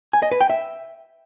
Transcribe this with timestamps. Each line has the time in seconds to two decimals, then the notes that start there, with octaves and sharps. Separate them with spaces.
0.13 G#5
0.22 D#5
0.31 B4
0.41 G5
0.50 E5